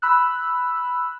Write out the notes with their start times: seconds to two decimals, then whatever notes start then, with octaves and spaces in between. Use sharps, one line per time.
0.02 B5 E6 F#6